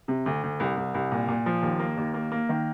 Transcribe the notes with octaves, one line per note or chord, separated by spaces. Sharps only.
C3
D2
D2
C2
C2
C2
A#2
A#2
F3
D#2
A#3
D#2
A#3
A#3
D#3